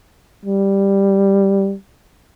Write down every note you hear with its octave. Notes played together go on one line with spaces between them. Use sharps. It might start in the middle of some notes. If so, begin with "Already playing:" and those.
G3